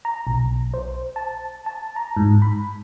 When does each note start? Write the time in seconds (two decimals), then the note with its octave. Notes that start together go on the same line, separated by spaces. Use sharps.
0.05 A#5
0.27 B1
0.74 C5
1.16 A5
1.66 A5
1.96 A#5
2.17 G#2
2.42 B5